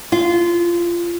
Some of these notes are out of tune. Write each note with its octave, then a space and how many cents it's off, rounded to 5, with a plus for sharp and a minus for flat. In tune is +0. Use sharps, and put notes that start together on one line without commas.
F4 -20